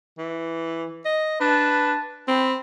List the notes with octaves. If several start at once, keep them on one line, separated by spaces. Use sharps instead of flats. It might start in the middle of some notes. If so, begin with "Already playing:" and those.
E3
D#5
D4 B4 A5
C4 G5 B5